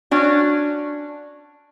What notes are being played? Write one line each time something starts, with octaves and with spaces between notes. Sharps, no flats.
C#4 D4 F#4